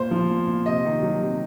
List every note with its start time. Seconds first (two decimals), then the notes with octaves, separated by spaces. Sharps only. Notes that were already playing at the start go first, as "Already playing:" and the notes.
Already playing: A#2 C5
0.11 F3
0.30 A#2
0.47 A#2
0.66 C3 D#5
0.85 D#3
1.03 F#3
1.21 C3